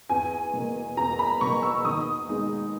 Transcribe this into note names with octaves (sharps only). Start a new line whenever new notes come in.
E2 G#5
B2 A#3
E2 A#5
B5
B2 A#3 C#6
E6
D#3 D#6
G#3 B3 D#4